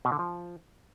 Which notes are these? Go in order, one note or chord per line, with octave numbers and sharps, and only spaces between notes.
B2
D3
F3